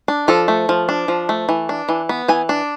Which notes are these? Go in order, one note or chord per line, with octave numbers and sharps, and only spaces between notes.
D4
F3 A4
A3
F3
D4
F3
A3
E3
D4
E3
B3
E3 G#5
D4